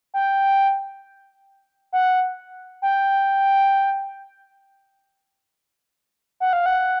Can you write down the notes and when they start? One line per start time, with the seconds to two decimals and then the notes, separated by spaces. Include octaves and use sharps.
0.14 G5
1.93 F#5
2.82 G5
6.40 F#5
6.53 F5
6.66 F#5